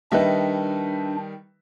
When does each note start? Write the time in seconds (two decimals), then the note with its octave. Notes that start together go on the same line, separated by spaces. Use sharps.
0.12 D#3 G3 D4 B4 D#5 E5